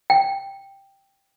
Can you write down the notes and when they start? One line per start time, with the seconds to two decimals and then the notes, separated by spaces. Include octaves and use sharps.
0.10 G5